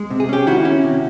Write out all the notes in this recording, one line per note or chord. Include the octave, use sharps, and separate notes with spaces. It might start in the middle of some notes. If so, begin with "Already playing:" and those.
Already playing: G#3
C3
G#4
C#4 G4
D#3 E4 F#4
C#4
C3